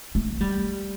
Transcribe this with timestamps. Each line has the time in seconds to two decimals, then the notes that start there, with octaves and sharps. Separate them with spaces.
0.15 A3
0.41 G3